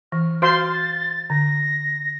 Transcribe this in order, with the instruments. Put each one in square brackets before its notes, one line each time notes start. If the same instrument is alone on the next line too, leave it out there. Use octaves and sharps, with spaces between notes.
[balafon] E3 [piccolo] F6
[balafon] F#4 [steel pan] C5 F5 C6 [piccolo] A6
[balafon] D3 [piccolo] A#6